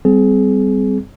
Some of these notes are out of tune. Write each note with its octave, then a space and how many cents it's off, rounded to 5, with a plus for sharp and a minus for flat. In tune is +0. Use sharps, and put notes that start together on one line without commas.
G3 +0 C4 -25 G#4 +25